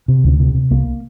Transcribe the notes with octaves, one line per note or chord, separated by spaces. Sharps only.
C3
D2
C3
C3
C2 A#3